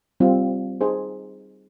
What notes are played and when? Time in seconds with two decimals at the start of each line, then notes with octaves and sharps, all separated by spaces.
0.20 G3 C4 F4
0.81 D#4 G#4 C5